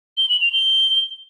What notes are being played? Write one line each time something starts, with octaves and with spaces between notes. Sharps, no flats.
G7
F#7
F7
G7